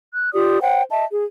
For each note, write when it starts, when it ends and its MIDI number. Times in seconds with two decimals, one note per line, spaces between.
0.13 0.33 90
0.34 0.60 65
0.34 0.60 67
0.34 0.60 74
0.34 0.60 87
0.61 0.83 72
0.61 0.83 73
0.61 0.83 78
0.61 0.83 79
0.90 1.05 75
0.90 1.05 76
0.90 1.05 81
1.11 1.23 68